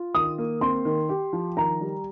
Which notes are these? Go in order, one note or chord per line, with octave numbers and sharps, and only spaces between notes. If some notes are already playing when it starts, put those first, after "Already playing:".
Already playing: F4
D#3 D#6
A#3
C4 C6
D#3
G4
F3
D#3 A#5
G3